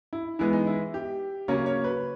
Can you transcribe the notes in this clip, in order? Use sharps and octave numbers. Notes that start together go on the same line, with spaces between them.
E4
E3 G#3 B3 E4
D#4
E4
G4
C#3 F#3 A#3 C#4 C#5
C#5
B4